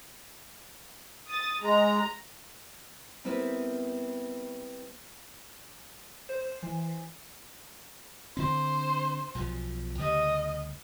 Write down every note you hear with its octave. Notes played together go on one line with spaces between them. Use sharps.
D#6 A6
G#3 A#5
G3 B3 C4 E4 A#4 B4
C5
E3
D3 C4 C5
B1 B2 F3
D2 C#3 G3 D#5